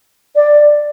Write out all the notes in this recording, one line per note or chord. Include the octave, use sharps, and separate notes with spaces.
D5